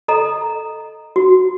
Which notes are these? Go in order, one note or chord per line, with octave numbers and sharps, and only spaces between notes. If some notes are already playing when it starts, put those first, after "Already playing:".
A4 D#5 A#5
F#4